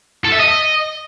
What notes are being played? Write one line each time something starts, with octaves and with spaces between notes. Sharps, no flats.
A4
E5
D#5